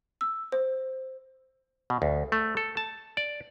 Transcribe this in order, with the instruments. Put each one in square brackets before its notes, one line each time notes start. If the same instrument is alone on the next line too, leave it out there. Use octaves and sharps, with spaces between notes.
[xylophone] E6
C5
[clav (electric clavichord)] B2
D2
A3
A4
A5
D5